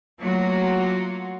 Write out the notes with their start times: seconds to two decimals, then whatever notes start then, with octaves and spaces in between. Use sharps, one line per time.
0.20 F#3 A3 A#3 F4 F#4 C#5